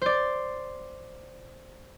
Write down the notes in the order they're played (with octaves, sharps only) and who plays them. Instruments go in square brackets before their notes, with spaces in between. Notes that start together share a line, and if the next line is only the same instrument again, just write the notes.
[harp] C5 D5